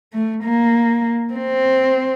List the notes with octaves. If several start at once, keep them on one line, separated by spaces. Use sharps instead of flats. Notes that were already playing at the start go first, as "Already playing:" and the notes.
A3
A#3
C4